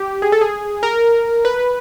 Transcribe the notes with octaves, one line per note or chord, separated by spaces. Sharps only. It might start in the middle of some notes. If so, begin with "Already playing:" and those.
Already playing: G4
G#4
A4
G#4
A#4
B4